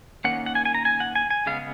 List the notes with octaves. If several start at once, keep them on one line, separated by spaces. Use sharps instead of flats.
D#3 A#3 C#4 F#5
F#5
G#5
G#5
A#5
G#5
F#5
G#5
G#5
C#3 G#3 B3 F5